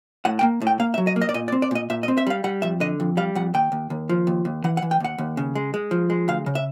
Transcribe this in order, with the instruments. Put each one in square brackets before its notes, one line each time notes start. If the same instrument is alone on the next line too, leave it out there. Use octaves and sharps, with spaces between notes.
[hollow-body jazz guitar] A2 F#5
G5
A#3
A2
G5
A#3 F5
E5
F#3
D#5
A#3
D#5
D5
A#2 D#5
D5
C4
D5
A#2 D#5
A#2 E5
D#5
C4
E5
G3 F5
G3 F#5
F2 E5
D3 D#5
F2
G3 F5
F2 F#5
D#2 G5
D#2
D#2
F3
D#2
D#2
E3 F#5
F#5
E3
G5
D#2 F#5
D#2
C#3
G#3
G#3
F3
G#3
D2 F5
C#3
E5